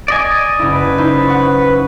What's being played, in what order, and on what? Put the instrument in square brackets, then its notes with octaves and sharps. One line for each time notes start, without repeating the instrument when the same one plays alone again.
[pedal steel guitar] D5 D#5 G#5
[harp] F#1 E4
[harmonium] B4
[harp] D#4 E4 C5
F#5 C#6